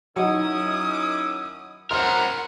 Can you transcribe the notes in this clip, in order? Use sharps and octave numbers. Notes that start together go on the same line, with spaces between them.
D#3 F#3 C#4 D#4 E4 D#6
F#2 C4 A#4 F#5 C6 F6